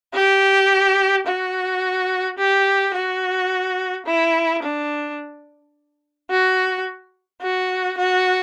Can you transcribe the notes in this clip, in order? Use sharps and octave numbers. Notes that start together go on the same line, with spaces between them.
G4
F#4
G4
F#4
E4
D4
F#4
F#4
F#4